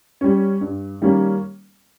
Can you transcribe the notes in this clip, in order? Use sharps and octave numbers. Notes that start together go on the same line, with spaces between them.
G3 C#4
G2
D#3 G3 A#3 C#4